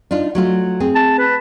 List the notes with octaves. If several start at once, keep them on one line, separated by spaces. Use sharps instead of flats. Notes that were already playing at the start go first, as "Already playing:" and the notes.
D4 D#4 F4
F#3 A3 F4
C4 G#4
A5
B4